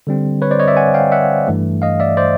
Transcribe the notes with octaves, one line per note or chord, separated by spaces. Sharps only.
D3 G3 C4
B4 C#5
C5 D5
C#5 D#5
D5 E5
F#5 G#5
F5 G5
E5 F#5
G2 E3 A3
D#5 F5
D5 E5
C5 D5